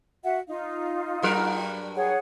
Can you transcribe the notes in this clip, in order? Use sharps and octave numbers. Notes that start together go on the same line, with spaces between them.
F#4 E5 F#5
D#4 F4 F5
G2 F#3 A#4
G#4 C#5 F#5